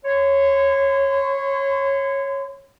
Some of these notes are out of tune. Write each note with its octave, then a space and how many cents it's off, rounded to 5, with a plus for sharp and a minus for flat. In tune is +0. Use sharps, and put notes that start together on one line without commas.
C#5 -15 C6 -40